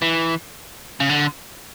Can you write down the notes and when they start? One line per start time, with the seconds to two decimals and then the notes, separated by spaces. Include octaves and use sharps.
0.02 E3
1.00 C#3
1.09 D3